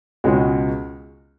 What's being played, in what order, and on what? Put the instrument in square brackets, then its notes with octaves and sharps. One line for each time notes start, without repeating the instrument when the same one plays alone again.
[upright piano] C#2 B2 G#3 C#4 F#4